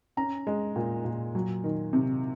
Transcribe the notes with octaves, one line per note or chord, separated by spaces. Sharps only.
C#4 A#5
G#3
A#2
A#2
F#3
D#3
C3